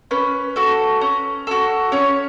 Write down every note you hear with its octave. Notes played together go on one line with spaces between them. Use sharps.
C#4 B4
F#4 A4
C#4
F#4 A4
C#4 C#5